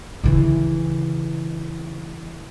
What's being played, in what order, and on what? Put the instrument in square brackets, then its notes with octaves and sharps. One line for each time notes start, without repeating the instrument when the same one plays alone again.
[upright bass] C#3 E3